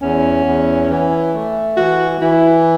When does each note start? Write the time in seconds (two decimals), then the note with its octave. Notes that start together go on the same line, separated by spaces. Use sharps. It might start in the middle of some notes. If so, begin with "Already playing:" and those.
0.02 E2 C#4
0.46 E2
0.89 E3
1.34 A3
1.77 E3 F#4
2.21 E3 E4